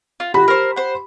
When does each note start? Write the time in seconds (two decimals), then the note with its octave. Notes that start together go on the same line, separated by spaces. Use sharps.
0.20 F4
0.34 F#4 G4 B5
0.48 A#4 C5
0.76 C5 F#5